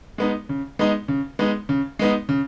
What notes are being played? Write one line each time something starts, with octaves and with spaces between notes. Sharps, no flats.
G#3 B3 D#4
C#3
G#3 B3 D#4
C#3
G#3 B3 D#4
C#3
G#3 B3 D#4
C#3